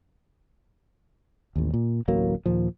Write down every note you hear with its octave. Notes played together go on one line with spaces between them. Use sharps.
A1 D#2
A#2
D1 A1 F#3 A#3
D#2 A#2 F3